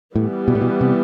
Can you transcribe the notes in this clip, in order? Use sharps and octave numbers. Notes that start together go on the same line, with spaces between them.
A2 E3 G3 B3
B2
A2
B2
C3